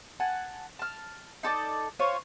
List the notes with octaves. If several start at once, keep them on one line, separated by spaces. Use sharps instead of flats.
F#5 G#5 A5
A5 F6
D#4 A4 D5 A5
F4 C5 C#5